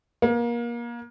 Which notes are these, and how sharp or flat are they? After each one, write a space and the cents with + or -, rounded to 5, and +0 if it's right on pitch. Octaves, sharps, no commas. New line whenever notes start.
A#3 +30